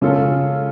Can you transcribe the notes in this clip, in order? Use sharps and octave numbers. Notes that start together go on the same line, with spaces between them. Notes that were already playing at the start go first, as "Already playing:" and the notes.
C#3 G#3 C#4 F4 A4